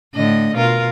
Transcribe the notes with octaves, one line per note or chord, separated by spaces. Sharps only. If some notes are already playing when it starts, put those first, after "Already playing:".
A2 D3 D#5
B2 F4 A#4